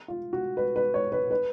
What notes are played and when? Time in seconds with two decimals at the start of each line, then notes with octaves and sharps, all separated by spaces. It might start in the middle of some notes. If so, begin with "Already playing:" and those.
0.08 F4
0.33 F#4
0.57 B4
0.76 B4
0.94 C#5
1.12 B4
1.31 B4